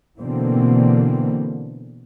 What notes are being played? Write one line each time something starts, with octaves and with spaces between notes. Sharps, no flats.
B2 D3 E3 A#3 C4